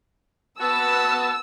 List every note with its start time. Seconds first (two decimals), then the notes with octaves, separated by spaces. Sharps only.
0.60 B3 F#4 A5 E6